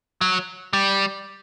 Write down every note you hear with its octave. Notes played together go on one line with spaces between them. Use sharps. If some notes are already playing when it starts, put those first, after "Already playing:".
F#3
G3